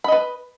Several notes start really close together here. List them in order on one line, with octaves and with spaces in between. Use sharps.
B5 D#5 B4